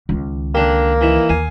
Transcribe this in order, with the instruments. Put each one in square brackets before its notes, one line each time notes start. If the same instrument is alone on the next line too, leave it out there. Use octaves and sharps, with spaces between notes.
[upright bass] C#2 D#3
[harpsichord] D3 D4 G4 [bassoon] A#3
[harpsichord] E3 D#4 E4
[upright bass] D#2 [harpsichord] F5 G#5 D#6